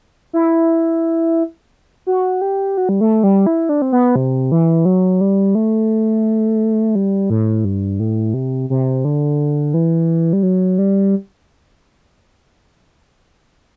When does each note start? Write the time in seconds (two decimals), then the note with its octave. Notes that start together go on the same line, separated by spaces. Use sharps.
0.33 E4
2.07 F#4
2.41 G4
2.77 F#4
2.89 G3
3.01 A3
3.23 G3
3.47 E4
3.69 D4
3.82 C4
3.92 B3
4.16 C3
4.52 E3
4.85 F#3
5.21 G3
5.55 A3
6.95 G3
7.30 A2
7.65 G2
8.00 A2
8.34 C3
8.70 C3
9.05 D3
9.74 E3
10.33 G3
10.43 F#3
10.78 G3